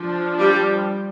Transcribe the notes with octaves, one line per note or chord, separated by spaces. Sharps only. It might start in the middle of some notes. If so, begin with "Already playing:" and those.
Already playing: F3 D4
G3 G4